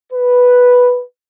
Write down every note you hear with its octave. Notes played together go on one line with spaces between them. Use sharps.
B4